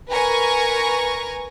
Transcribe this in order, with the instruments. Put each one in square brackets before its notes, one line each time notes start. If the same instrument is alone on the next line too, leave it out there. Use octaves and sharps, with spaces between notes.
[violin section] A#4 B4 G#5 A#5 C#6